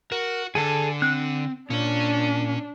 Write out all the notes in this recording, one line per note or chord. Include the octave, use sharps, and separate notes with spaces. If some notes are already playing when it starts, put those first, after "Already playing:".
F#4 A#4
D3 G#4 A4 G#5 A5
C4 F#6
A#2 C#4 D4 C#5